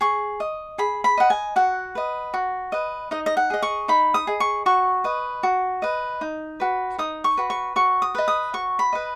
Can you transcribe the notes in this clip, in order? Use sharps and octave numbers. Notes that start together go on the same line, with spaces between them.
G#4 C#6
D#5
G#4 B5
B5
D#5 F#5
G#5
F#4 F#5
B4 D#5
F#4
B4 D#5
D#4 D#5
D#5
F#5
G#4 D#5
C#6
D#4 B5
D#6
G#4 D#5
C#6
F#4 C#6
B4 D#5
F#4
B4 D#5
D#4
F#4 B4
D#4 D#6
C#6
F#4 B4
C#6
F#4 C#6
D#6
B4 D#5
D#6
F#4 C#6
B5
B4 D#5